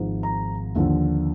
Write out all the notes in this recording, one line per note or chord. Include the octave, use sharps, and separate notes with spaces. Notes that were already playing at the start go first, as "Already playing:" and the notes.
Already playing: G#1 G#2 F3
A#5
D#2 D3 F3